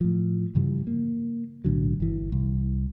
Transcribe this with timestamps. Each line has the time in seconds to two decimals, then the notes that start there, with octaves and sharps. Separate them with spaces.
0.01 A2 F3
0.55 G2 C#3 E3 G3
0.87 A#3
1.64 B1 A2 D3 F#3
2.00 G1 E3
2.32 C2